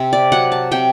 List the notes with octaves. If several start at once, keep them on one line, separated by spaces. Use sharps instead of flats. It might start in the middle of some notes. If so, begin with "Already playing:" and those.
Already playing: C3 C4 E5
D5
F#3 F#5
A5
C3 G5